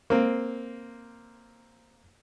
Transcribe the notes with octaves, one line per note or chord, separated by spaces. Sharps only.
A#3 C4